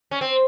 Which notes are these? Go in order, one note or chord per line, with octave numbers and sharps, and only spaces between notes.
C#4
C4